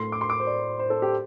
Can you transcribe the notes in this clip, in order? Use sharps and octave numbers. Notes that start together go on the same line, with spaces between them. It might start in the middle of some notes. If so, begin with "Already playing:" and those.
Already playing: A2 A3 C6
D6
C6
D6
C5
D5
C5
A4
G4